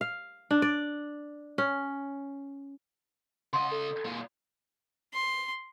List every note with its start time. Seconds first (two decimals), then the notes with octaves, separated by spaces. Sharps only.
0.01 F5
0.51 D4
0.62 D5
1.58 C#4
3.53 C#3 D#5 F#5 C6
3.71 A4
4.05 A#2 G#3
5.13 C6